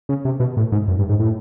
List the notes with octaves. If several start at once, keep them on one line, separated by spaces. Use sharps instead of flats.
C#3
C3
B2
A2
G#2
F#2
G2
G#2
A2